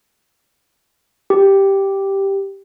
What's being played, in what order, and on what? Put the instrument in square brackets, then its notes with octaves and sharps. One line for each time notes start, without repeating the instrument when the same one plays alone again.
[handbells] G4